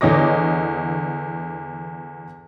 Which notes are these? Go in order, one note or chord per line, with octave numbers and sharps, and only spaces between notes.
E2 D3 C#5 D#5 D6 A#6